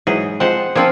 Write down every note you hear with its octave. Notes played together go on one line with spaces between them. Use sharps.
G#2 E3 F#3 G#4
F3 G#3 C4 C5 F#5
F3 A#3 C4 D4 F4 G#5